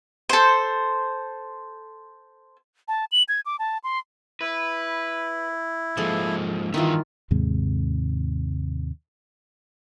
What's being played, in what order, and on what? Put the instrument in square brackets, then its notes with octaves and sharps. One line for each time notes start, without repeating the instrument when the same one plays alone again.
[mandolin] A4 C5
[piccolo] A5
F#7
G#6
D6
A5
C6
[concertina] E4 [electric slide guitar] B4
[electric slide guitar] G#2 F3 A#3 [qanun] G#4 A4 C6
[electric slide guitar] G2 B3 E5 [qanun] D#3 E3 F4
[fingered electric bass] D#2 G#2 C3 G#3